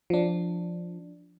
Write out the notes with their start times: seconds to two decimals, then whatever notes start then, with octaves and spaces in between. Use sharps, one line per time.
0.10 F3 D4